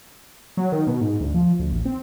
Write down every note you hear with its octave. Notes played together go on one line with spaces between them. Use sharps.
F#3
D#3
B2
G#2
D2
F3
D2
A1
C4